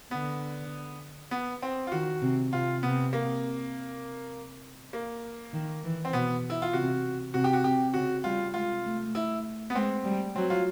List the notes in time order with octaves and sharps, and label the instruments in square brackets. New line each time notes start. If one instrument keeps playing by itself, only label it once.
[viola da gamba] D3 [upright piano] B3
[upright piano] B3
C4
F4
[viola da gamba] D#3 [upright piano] F#4
[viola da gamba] C3
[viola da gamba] C3 [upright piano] F4
[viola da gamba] C3 [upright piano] B3
[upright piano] A#3
A#3
[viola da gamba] D#3
E3
[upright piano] C4
[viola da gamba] B2 [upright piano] B3
[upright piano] E4
F4
[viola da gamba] C3 [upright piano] F#4
[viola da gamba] C3 [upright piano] F#4
[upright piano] G4
F#4
[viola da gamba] C3 [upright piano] G4
[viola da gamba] C#3 [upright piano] F#4
[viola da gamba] G3 [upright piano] F4
[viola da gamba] G#3 [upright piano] F4
[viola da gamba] A3
[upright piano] E4
B3
[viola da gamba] G#3 [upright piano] C4
[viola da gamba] G3
[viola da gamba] F#3 [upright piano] C4
[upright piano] F4